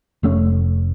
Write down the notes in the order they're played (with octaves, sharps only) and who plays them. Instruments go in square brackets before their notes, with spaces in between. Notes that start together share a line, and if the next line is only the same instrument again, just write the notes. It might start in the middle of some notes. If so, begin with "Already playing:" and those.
[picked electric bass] F1 A3 C#4